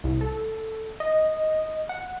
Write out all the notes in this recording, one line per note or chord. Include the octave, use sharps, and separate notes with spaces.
C2
A4
D#5
F#5